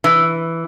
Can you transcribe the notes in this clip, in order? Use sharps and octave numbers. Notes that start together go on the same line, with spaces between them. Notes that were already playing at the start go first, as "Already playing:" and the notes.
E3